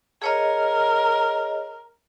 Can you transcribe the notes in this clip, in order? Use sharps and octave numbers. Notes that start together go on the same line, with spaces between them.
G#4 A#4 C#5 D#5